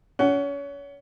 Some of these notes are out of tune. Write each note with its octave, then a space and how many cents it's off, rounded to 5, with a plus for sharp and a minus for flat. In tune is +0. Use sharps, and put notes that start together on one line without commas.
C#4 +30 F#5 +15